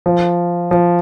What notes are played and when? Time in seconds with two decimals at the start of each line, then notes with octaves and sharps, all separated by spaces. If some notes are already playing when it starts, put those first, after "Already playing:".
0.06 F3
0.71 F3